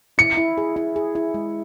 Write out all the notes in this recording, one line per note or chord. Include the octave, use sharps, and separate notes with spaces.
E4 C#7
E4
G#4
E4
G#4
E4
G#3